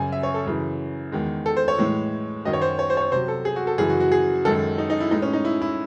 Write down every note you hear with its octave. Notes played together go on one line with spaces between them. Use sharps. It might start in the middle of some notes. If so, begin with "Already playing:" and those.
Already playing: F#2 C#3 F#3 G#5
E5
C#5
A4
F#2 C#3 E3
E2 D#3 G#3
A4
C5
C#5
A2 E3 G#3
F#2 D#3 F#3 D#5
C#5
C5
C#5
C5
C#5
C5
C3 F#3 C5
A4
G#4
F#4
A4
F#2 C#3 E3 G#4
F#4
F#4
G#4
F#2 D#3 G#3 A4
D#4
D#4
E4
A2 G#3 D#4
C#4
D#4
E4
E4